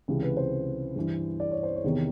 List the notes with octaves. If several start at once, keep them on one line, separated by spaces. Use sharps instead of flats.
C#2 C3 E3
B4
C5
G2 E3
D5
C#5
C5
C#5
E2 C3 D#3